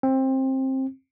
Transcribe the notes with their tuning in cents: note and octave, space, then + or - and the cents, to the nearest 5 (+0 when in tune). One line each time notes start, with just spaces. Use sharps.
C4 +20